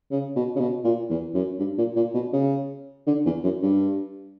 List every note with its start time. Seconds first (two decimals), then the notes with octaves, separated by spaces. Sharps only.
0.11 C#3
0.36 B2
0.56 C#3
0.60 B2
0.84 A#2
1.10 E2
1.34 F#2
1.59 G2
1.78 A#2
1.96 A#2
2.14 B2
2.33 C#3
3.07 D3
3.25 E2
3.43 F#2
3.62 G2